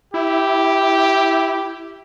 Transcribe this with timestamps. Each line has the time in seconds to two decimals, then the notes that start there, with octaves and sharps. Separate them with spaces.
0.14 E4 G4